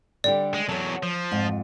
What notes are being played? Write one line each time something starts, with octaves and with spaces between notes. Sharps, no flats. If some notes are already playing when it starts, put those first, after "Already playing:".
D3 G3 G4 D5
G#3
E2 F#3 C#5 A5
F3
F2 G#2